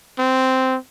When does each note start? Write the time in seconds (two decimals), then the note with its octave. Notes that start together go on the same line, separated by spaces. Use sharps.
0.19 C4